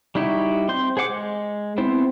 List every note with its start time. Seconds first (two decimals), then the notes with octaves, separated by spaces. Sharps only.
0.15 G3 D#4 E4 F#4 G4
0.69 C4 C6 G6
0.97 G#4 C5 F#5 D6
1.09 G#3
1.78 B3 C4 E4 C5